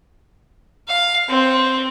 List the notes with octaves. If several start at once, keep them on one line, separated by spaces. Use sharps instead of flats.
F5
C4